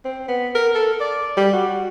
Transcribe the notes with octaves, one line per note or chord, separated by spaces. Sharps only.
C4
B3
A#4
A4
D5
G3
F#4